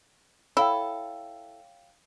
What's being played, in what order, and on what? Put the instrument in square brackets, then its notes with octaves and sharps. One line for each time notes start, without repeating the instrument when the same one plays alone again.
[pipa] E4 A4 [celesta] C#5 F5 G5